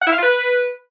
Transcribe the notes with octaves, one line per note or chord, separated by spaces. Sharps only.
F#5
E4
F5
F4
B4